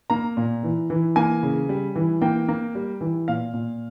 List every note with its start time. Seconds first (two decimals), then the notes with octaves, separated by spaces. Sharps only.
0.10 A#3 A#5
0.37 A#2
0.63 E3
0.90 E3
1.16 A#3 G#5
1.43 C#3
1.69 G3
1.95 E3
2.22 A#3 G5
2.48 A#3
2.75 G3
3.01 E3
3.28 A#2 F5
3.54 A#2